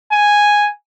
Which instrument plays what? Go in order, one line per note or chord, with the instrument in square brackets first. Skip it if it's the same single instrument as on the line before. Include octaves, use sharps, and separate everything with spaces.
[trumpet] G#5